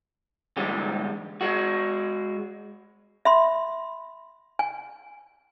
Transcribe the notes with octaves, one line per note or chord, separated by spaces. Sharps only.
E2 G#2 D3 G3 G#3 G4
G#3 F#4
E5 B5 C6
G#5